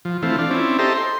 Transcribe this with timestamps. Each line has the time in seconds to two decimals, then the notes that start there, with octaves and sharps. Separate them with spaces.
0.05 F3
0.22 E3 A3 C4 F4
0.38 D4 F4
0.50 C4 C#4 E4 D5
0.79 G4 A4 C5 D#5 E5 A#5
0.96 C6